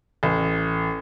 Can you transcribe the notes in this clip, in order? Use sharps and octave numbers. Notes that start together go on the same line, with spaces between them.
A1